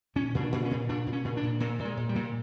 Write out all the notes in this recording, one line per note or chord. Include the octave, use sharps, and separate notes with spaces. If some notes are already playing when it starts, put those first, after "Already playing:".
A#2 C#4
A#2
D4
A#2
C#4
A#2
A#2 D4
A#2
C#4
A#2
D4
A#2
A#2 A#3
A#2
G#3
A#2
G3
A#2